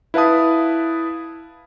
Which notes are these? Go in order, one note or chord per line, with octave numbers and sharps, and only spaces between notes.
E4 B4 F5 A5 D#6